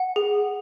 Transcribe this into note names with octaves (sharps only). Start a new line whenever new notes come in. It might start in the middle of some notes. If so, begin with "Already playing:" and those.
Already playing: F#5
G#4